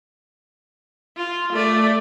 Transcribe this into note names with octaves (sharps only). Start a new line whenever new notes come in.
F4
A3 D5